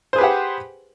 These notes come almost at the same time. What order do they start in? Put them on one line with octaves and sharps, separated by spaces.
C5 G#4 B4 G4 F#5